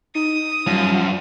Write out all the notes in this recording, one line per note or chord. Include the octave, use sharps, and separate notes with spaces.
D#4 D#6
F#2 F3 G3